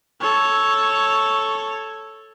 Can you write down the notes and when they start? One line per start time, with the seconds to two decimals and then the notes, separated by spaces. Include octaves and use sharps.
0.21 A4 C#5